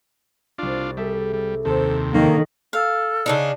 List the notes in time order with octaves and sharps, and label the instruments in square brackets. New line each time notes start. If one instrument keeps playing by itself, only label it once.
[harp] C2 A6 [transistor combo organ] D4 F4
[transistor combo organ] G3 [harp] G#4 A4 E5
[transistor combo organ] G3
[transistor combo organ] D#2 C3 [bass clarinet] A4 [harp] C5 A5 C6
[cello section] D#3 [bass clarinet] A#3 [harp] A4 C#5 C#6
[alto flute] A4 [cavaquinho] F5
[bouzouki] C#3 D4 D#4